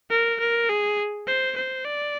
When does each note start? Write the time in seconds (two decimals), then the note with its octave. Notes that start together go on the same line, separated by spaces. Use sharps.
0.10 A#4
0.40 A#4
0.69 G#4
1.27 C5
1.56 C5
1.85 D5